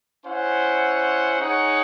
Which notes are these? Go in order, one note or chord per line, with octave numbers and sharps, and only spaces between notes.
C#4 E4 C5 F#5
D#4 G#4 C#5 F#5